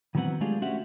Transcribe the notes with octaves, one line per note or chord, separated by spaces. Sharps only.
D#3 E3 F#3 B3 C4 F#5
G#3 A3 D4 F4 G4 G#4
C#4 F#4 G4 C5 E5 F#5